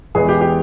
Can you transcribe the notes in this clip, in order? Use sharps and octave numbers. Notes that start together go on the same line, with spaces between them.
E2 E3 G#3 G#4
G4
G4